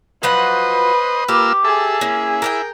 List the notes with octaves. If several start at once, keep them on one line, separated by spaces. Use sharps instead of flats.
F3 F#3 B4 C5 D#5 F#5
A#3 F4 G4 E6
G#4 A4 E5
A#3 C#4 E4
A#4 D5 G5